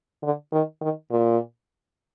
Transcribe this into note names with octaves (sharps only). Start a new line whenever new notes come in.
D3
D#3
D#3
A#2